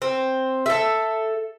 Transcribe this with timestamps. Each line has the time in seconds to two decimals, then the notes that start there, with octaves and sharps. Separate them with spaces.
0.02 C4
0.66 A4 E5